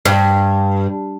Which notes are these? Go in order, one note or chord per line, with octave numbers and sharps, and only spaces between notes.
G2